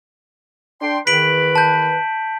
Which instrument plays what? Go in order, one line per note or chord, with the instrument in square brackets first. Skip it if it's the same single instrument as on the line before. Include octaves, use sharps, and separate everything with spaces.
[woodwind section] D4 G5 C6
[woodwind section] E2 D#3 B4 [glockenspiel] B6 D7 F#7
[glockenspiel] A5 G6